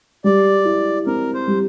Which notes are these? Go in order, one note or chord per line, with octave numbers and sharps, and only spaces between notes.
G3 D5
E4
C4 A#4
C5
G3